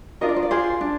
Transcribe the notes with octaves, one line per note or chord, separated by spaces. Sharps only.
D4 F4 A#4 D#5
D5
C5
D5
F4 G#4 C5
D4